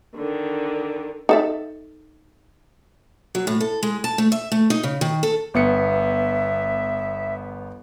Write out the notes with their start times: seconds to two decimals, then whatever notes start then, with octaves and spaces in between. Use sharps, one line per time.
0.16 D3 D#3
1.29 D#4 A4 E5
3.35 F#3
3.47 A2
3.61 A4
3.83 G#3
4.04 A5
4.18 A3
4.32 E5
4.52 A3
4.70 D#4
4.83 C#3
5.01 D#3
5.23 A4
5.54 G1 B3 E5 C#7